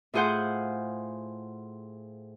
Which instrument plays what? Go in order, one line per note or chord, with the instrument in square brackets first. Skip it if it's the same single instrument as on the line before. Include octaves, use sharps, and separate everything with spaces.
[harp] A2 F4 G#4 C5 F#5 G6